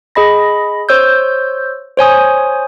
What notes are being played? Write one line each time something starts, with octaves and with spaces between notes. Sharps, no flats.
G#4 D#5 B5 A#6
C5 C#5 E6 G6
C5 C#5 G#5 D#6